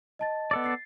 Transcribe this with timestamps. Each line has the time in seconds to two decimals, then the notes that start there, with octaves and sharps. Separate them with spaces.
0.19 D#5 A5 A6
0.51 B3 A4 D5
0.64 A6 C7